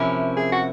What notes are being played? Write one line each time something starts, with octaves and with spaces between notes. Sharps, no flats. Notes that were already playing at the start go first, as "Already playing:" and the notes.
Already playing: C3 F3 A#3 C#4 E4
G#4
F#4